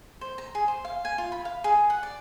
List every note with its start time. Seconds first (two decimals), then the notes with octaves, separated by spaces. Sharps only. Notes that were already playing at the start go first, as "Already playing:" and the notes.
0.21 C5
0.38 A#5
0.55 G#4
0.68 C5
0.85 F5
1.05 G#5
1.18 F4
1.32 B5
1.45 F5
1.64 G#4
1.90 F#5
2.03 D5